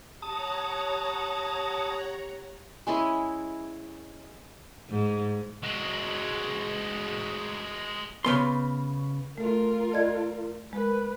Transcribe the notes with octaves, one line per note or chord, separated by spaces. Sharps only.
G4 C#5 F#5 A5 A#5 D#6
G#3 C#4 E4 G#4
G#2
G#3 F#4
C#3 B3 C6
A3 F4 A4 A#4
D5 D#5 G#6
G#3 A#4 B4